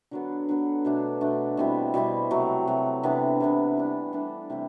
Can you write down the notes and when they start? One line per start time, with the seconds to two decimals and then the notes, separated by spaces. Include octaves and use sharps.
0.11 D3 F#3 B3
0.49 D3 F#3 B3
0.85 B2 A3 D4
1.21 B2 A3 D4
1.57 B2 G3 C4 E4
1.94 B2 G3 C4 E4
2.31 C3 F#3 A3
2.68 C3 F#3 A3
3.03 C3 E3 B3 D4
3.40 C3 E3 B3 D4
3.77 E3 G3 D4 A4
4.13 E3 G3 D4 A4
4.50 C3 E3 A3 E4